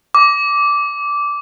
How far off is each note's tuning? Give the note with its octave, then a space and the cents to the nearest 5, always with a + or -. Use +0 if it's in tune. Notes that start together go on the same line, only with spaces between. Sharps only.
D6 -15